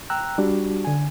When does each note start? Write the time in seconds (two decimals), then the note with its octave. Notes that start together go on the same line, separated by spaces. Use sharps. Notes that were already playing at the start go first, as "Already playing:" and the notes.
0.10 G5 A#5 E6 F#6
0.38 G3 D4 F#4 G4
0.85 D3 G#5